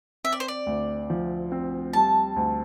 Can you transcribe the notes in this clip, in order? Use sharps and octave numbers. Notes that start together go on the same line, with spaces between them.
C4 E5
D5
C5
D5
D2
F3
C4
G3 A5
D2